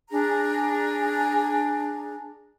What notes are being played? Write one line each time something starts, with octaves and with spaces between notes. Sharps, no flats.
D4 G#4 A#5